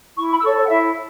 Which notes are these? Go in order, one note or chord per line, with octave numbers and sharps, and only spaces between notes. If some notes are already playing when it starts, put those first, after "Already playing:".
E4 C#6
B5
E6
A4 C#5 C#6
C#5
F#5
E4 E5